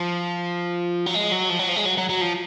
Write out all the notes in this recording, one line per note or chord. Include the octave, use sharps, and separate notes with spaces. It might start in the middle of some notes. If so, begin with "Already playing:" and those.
Already playing: F3
F#3
G#3
F#3
F3
F#3
F3
G#3
F#3
F#3
F#3
F3